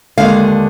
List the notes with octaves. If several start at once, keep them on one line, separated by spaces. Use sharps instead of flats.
D#2 D3 G#3 F5